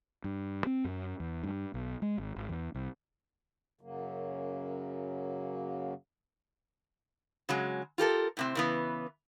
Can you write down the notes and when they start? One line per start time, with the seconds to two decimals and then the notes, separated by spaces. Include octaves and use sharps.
0.24 G2
0.66 C4
0.84 F#2
1.20 E2
1.43 G2
1.74 B1
2.02 G#3
2.18 G#1
2.36 G#1
2.49 E2
2.75 C2
3.81 F#2 C#3 F#3 A#3
7.49 C#3 F#3 G#3
7.98 F4 G4 A4 A#4
8.37 A2 C3 C4
8.55 C#3 E3 B3